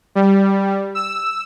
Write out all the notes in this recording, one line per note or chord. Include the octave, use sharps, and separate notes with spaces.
G3
E6